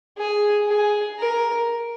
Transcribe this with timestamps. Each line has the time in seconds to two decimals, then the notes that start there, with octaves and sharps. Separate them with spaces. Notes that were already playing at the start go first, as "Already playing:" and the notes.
0.18 G#4
0.68 G#4
1.18 A#4